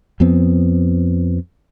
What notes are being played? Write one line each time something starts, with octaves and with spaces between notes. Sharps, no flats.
F2 F3 B3 C4